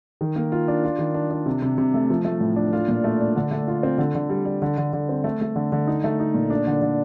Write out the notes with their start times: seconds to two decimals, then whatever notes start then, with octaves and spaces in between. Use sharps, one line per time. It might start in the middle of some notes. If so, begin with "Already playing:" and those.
0.21 D#3
0.36 A#3
0.52 F4
0.68 D4
0.84 F4
0.99 D#3
1.14 D4
1.30 D4
1.46 C3
1.62 C3
1.78 C3
1.94 A3
2.10 F3
2.25 A3
2.40 A2
2.56 D4
2.73 F4
2.88 A#2
3.04 A3
3.20 D4
3.36 D3
3.51 A3
3.68 F4
3.83 C4
3.98 D3
4.15 D3
4.30 G3
4.45 G3
4.62 D3
4.78 D3
4.93 D3
5.09 C4
5.24 A3
5.41 A3
5.56 D3
5.72 D3
5.87 D#4
6.04 A3
6.20 D#4
6.34 A#2
6.50 D4
6.67 D3
6.82 D3